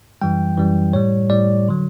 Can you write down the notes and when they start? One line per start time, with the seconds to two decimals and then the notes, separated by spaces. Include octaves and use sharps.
0.21 F#2 E3 G3 G5
0.57 F#2 E3 G3
0.93 A2 G3 C#5
1.30 A2 G3 D5
1.69 D3 F#3